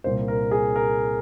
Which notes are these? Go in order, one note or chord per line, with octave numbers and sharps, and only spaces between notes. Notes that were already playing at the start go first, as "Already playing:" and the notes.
C2 A#2 A#3 C5
A#4
G#4
A#4